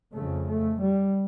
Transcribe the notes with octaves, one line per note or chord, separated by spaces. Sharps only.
F2 C#3 A3
A3
G3